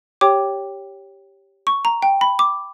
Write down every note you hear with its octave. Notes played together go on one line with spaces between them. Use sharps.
G4 C#5 G5 D6
C#6
A#5
G5
B5
D6